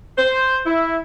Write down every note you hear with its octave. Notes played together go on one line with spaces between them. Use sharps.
C5
E4